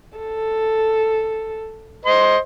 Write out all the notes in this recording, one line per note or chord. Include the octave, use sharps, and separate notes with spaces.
A4
C5 D#5 C6